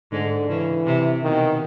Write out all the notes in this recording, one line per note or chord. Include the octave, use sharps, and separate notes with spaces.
G#2 D3
C#3 E3
C3
B2 D#3